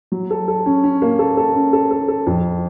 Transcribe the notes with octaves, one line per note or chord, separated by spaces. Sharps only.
F#3
A4
A4
C#4
C#4
A#3
A4
A4
C#4
A4
A4
A4
F2